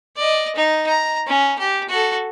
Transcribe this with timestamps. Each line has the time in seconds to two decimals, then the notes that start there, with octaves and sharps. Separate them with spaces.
0.17 D5 D#5
0.56 D#4
0.88 A#5
1.27 C#4
1.59 G4
1.89 F#4 A4